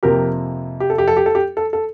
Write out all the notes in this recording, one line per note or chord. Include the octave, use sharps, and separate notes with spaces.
F2 C3 F3 A#3 G4 A#4
G4
A4
G4
A4
G4
A4
G4
A4
A4